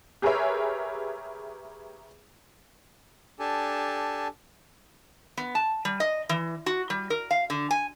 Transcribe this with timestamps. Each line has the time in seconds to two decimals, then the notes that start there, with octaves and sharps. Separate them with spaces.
0.22 G4 G#4 A#4 B4 C#5 E5
3.39 D4 G4 A4 G#5 A5
5.37 B3
5.55 A5
5.85 G3
6.00 D#5
6.29 E3
6.66 F#4
6.90 G3
7.10 A#4
7.31 F5
7.50 D3
7.71 G#5